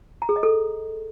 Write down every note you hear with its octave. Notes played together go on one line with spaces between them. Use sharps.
A#5
G#4
D#5
A4